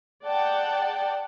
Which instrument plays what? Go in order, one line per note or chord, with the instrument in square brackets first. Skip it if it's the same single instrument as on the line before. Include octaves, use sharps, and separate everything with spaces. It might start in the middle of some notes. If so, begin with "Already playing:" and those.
[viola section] G#4 D5 F#5 G5 A5